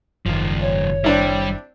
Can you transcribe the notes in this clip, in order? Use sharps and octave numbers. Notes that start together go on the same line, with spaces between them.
F#1 C#2 D#3 F3
C#5
G3 C4 D4 E4